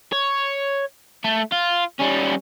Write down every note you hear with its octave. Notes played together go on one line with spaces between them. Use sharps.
C#5
A3
F4
G3 C#4